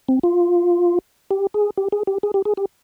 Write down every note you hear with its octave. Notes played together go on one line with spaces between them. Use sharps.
C4
F4
G4
G#4
G4
G#4
G4
G#4
G4
G#4
G4